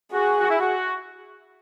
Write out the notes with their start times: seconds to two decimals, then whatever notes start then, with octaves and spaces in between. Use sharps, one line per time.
0.12 F#4 G#4
0.40 F#4
0.50 E4
0.59 F#4